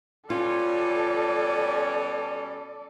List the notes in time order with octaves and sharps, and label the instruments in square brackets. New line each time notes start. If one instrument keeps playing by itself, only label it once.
[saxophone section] B2 G3 C#4 [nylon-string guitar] F4 [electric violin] A4 D5